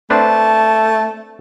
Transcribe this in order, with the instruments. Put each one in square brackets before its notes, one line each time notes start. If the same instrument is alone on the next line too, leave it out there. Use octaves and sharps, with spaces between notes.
[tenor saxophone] A3 [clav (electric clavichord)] C4 D4 B4 [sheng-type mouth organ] A5